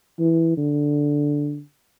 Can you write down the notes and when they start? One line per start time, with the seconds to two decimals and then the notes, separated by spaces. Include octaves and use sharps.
0.19 E3
0.57 D3